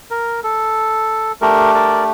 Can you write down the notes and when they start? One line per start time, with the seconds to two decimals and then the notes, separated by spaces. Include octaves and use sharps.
0.11 A#4
0.44 A4
1.41 A3 D4 G4 A#4
1.75 A#4 D5